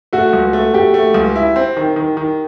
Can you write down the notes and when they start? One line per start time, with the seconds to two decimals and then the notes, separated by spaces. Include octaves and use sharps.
0.13 A3 F#4
0.33 C#2
0.53 A3
0.74 A3 G4
0.94 A3
1.14 C#2
1.36 E4
1.56 C4
1.77 D#3
1.96 D#3
2.17 D#3